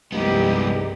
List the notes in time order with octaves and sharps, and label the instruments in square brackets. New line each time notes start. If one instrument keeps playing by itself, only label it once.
[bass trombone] C2 [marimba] G2 F3 A3 [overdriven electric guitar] G#3 B3 [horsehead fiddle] D#4 G4